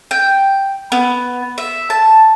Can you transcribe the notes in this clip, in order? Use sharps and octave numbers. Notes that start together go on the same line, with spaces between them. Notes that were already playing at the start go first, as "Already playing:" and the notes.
G5
B3
E5
A5